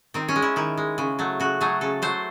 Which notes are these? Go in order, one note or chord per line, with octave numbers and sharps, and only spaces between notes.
D#3 C4
C#4
G#3
E4
D#3 E4
G#3
C#3
F#3 A3
C#3 F#4
F#3 A3 G#4
C#3 A4
F#3 A3 C5